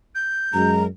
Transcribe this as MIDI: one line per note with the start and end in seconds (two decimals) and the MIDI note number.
0.15 0.70 91
0.53 0.85 42
0.53 0.85 56
0.53 0.83 82